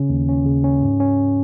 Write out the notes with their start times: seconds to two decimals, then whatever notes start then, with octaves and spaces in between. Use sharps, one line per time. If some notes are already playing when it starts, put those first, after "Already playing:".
Already playing: C#3 C#4
0.09 D#2
0.29 C#4
0.46 C#3
0.64 C#4
0.82 G#2
1.00 C#4